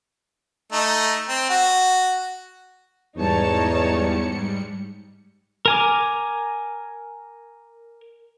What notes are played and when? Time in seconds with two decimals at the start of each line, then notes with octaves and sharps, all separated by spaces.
0.72 A3 D#4
1.29 C4
1.49 F#4
3.17 E2 G#2 G3 D#4 C#5 A5 C#7
5.66 A#4 G#5 D6